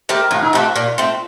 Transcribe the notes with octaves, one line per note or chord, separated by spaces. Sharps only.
A3 C4 G4 A#4
A2 F4
D#4
A3 C4 F4 G4
A#2
A3 C4